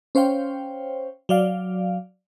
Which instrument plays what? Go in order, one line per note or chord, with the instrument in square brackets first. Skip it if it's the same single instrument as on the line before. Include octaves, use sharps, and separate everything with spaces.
[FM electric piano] C#4 C5 C#5 F5 G5
F#3 D5 F5